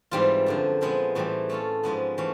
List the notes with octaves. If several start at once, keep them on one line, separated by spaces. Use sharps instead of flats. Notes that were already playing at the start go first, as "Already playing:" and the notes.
G#2 E3 G3 C4 F4
F#2 D3 F3
A#2 F3 G#3 B3 E4
A2 E3 G3 C4
A3 C#4 F4 A4
G#2 F3 G#3 B3
E3 A3 C#4